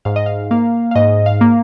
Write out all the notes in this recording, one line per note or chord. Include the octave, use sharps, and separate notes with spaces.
G#2 F5
D#5
F5
A#3 F5
F5
G#2 D#5
F5
A#3